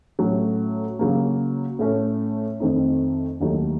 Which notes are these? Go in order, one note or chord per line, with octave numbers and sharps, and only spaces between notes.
A2 F#3 A3 C#4
C#3 F#3 A#3
A2 A3 C#4
F2 D#3 A3 C4 D#4
D#2 D#3 F#3 A3